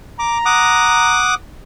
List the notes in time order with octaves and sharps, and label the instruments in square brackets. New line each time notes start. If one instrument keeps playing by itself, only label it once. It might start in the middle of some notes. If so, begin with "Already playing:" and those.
[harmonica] A#5 [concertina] D6
[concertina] F#5 D6 D#6